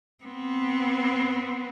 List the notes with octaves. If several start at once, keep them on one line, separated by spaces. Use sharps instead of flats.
B3 C4